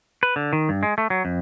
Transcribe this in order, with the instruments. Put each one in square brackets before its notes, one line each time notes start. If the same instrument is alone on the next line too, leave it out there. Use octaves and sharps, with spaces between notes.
[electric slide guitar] B4
D3
D#3
G2
G#3
A3
F#3
F2